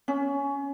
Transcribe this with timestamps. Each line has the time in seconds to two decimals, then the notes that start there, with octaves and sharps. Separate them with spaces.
0.08 C#4